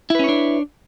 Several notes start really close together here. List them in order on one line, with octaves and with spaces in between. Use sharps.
E4 B4 C#4 C#5 D4